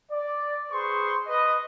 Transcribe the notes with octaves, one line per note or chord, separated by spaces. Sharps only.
D5
G#4 B4 C5 C6 C#6
B4 D#5